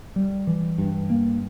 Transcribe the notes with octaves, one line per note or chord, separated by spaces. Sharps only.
G3
E3
G2
A#3